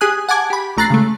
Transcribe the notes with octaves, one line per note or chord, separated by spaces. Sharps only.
G4 G#4 G#5 D#6 F#6
F#5 G#5 A5 D6 G#6
G4 B5
A#1 A3 A#5 F#6 A6 C7
C#3 G#3 A3